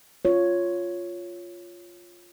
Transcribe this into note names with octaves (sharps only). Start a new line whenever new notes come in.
F4 C#5